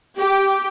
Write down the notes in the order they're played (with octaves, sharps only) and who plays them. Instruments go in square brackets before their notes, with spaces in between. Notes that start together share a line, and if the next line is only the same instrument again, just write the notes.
[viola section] G4